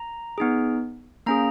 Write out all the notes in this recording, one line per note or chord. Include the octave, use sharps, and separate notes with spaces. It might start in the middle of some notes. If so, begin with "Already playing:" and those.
Already playing: A#5
B3 D#4 G#4
A#3 C#4 G#4 A#5